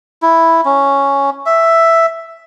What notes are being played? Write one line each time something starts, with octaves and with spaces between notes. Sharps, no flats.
E4
C#4
E5